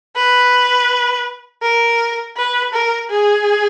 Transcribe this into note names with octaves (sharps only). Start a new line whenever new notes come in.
B4
A#4
B4
A#4
G#4